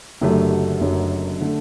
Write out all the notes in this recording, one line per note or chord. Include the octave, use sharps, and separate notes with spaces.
F#1 F#2 D3 F#3 A3 G4
F#4
F#1 F#2 D3 F#3 A3
D3 A3